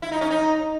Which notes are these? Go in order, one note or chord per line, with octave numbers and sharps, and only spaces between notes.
E4
D#4
C#4
D#4